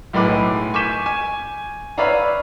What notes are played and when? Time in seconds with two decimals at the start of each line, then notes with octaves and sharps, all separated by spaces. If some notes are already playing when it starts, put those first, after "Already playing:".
0.13 B1 A2 G#3 B4 D6
0.74 G#5 C#6 D6 G6 B6 E7
1.06 G#5
1.98 B4 C#5 D5 E5 F5 A#5